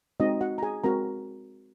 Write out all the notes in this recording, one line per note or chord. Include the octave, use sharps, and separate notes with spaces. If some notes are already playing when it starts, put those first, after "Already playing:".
G#3 C4 D#4 F#4 D#5
F#4 F#5
A#5
G#4 G#5
G#3 C4 F#4 A#4 A#5